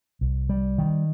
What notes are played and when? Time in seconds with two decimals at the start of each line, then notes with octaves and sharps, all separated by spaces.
0.21 C2
0.49 G3
0.78 D#3